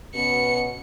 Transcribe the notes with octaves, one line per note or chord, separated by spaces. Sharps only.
B2 B3 C#4 C#7